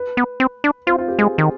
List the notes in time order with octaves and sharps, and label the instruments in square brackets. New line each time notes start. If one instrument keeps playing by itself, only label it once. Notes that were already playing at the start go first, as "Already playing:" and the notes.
Already playing: [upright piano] B4
[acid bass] B3
C4
D4
[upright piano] C4 [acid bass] F4
[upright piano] F4
G4
[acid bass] G#3 [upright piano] G#4
[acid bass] D#3